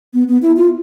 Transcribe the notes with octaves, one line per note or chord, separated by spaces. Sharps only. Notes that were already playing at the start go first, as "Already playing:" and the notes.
B3
B3
E4
F4